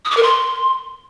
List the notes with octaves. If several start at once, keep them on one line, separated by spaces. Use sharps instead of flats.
D#6
D6
A#4
C6